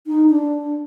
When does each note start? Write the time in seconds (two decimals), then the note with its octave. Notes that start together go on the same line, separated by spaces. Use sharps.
0.07 D#4
0.30 D4